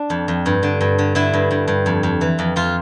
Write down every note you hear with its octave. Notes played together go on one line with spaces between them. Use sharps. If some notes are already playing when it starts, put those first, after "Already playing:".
Already playing: D4
F2
F2
G2
D3
G2
D3
D3 E4
G2
G2
G2
F2
F2
E3
F2
F2 F4